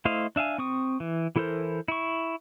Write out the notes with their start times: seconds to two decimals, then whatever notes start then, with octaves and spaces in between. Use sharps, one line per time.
0.05 A3 E4 C5 D#5 F5
0.36 D4 E5 F5 G#5
0.58 C4 C#6 D#6
1.00 E3
1.36 E3 E4 A4 A#4 C5
1.88 E4 C#6